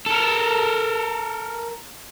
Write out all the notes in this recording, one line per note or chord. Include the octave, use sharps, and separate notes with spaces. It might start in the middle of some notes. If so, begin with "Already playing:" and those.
A4 A#4